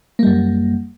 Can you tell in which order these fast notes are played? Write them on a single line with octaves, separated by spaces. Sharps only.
A#3 G3 F#2